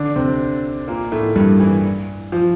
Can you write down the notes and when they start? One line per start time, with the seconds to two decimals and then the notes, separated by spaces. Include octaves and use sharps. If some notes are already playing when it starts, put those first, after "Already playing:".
Already playing: D3 D4
0.16 C3 C4
0.88 A#2 A#3
1.12 A2 A3
1.36 G2 G3
1.60 E3
2.32 F3